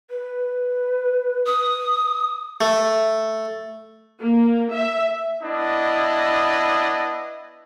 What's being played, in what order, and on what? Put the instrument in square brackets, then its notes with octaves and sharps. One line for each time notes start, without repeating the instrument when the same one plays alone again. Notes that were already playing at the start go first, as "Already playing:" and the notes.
[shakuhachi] B4
[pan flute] D#6
[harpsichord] A3
[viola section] A#3
E5
[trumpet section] B3 D4 E4 D#5